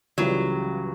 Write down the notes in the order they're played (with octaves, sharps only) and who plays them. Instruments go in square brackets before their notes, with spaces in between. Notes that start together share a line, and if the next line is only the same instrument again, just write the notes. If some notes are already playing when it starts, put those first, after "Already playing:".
[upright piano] C#2 C#3 E3 G3 [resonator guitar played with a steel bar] F#3